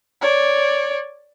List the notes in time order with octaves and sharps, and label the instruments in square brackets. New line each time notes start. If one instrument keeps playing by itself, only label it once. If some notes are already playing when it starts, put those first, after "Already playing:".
[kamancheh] C#5 D5